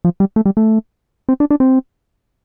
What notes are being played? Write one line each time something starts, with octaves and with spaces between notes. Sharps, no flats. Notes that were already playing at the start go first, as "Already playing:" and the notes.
F3
G3
A3
G3
A3
C4
D4
D4
C4